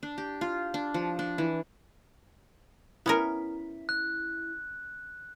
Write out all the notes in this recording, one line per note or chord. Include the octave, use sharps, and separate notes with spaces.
D4
G4
F4
D4
F3
D4
E3
B3 C#4 E4 A#4
F#6